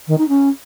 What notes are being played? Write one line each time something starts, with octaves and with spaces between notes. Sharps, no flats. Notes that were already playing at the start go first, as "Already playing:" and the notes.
D#3
D#4
C#4